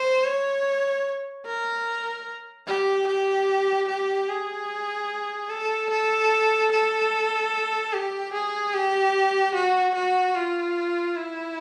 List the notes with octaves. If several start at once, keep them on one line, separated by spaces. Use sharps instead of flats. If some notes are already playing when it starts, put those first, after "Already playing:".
Already playing: C5
C#5
A#4
G4
G4
G4
G#4
A4
A4
A4
G4
G#4
G4
F#4
F#4
F4
E4